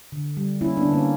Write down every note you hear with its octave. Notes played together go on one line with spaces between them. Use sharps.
D3
G3
A#3 C#4 E4
B3 D4
D3
A#3 C#4